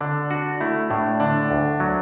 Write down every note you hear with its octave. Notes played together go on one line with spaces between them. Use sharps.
D3 D4
D4 F#4
A3 E4
A2 D4
D3 D4
D2
F#3